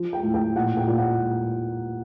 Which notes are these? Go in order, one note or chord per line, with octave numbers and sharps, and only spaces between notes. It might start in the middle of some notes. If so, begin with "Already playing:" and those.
Already playing: F3
G5
A2
G5
A#2 F#5
G5
A#2
F#5